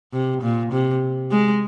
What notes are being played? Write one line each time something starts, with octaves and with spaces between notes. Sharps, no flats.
C3
A#2
C3
G#3